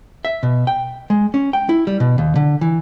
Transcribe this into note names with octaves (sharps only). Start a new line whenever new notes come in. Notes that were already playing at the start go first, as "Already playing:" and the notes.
E5
B2
G5
G#3
C#4
G5
E4
G3
B2
D#2
D3
E3